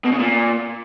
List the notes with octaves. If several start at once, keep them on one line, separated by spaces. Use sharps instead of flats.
B2
C#3
A#2